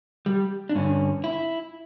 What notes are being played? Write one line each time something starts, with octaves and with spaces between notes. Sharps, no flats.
G3
D4
G2 D3 C#4
E4